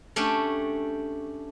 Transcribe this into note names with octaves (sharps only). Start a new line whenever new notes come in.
A3 C#4 D4 G4